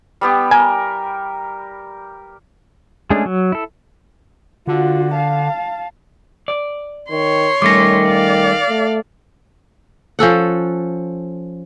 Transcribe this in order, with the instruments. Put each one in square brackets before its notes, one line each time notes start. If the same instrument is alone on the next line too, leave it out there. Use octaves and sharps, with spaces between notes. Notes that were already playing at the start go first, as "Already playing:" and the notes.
[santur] G3 B3 G4
[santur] A#4 [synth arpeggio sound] G#5
[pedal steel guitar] G#3 A3 C#4 D4 G#4
F#3
E4 A4
[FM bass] D3 [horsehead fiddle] F4 F#4
[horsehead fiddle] F5 A5
[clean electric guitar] D5
[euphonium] D#3 [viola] C#5 C6
[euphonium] D#3 [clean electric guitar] G3 A3 C#4 [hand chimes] D6 A#6
[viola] D5 F5
[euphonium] A3
[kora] F3 C#4 A4 F#5